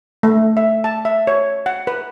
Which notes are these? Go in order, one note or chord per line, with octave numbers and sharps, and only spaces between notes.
A3
E5
A5
E5
C#5
F#5
B4